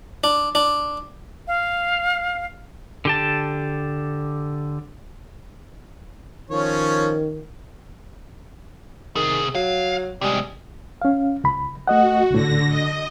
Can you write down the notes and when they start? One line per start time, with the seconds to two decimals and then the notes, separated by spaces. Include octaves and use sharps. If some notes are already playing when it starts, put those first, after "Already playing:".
0.24 D4
0.55 D4
1.47 F5
3.05 D3 G4 A5
6.50 D#3 F3 C#4 C#5
9.15 C3 D#3 G#4
9.55 F#3 F5
10.21 C3 G3 G#3
11.02 C#4 F5
11.44 C#2 B5
11.88 A3 F#4 D#5 F#5
12.31 C#2 A2 D3 A#6
12.69 D#5